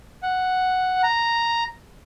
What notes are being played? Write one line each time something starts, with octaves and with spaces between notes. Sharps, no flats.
F#5
A#5